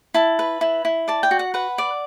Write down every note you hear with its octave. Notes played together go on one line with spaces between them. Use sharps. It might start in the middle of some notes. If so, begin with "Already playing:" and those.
E4 A5
B4
E4
E4
D5 A5
G5
F#4
F#5
B4 F#5
D5